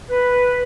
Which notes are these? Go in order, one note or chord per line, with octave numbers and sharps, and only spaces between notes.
B4